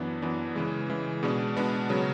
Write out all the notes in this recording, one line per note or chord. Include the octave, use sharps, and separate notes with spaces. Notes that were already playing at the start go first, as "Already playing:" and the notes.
Already playing: F#2 E3 B3 D4
F#2 E3 B3 D4
C#3 E3 G#3
C#3 E3 G#3
B2 G#3 B3 D4
B2 G#3 B3 D4
C#3 F#3 B3